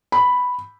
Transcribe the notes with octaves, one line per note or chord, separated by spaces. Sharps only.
B5